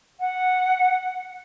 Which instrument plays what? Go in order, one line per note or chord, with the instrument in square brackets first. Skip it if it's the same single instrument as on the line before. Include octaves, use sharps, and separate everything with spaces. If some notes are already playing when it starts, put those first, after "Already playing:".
[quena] F#5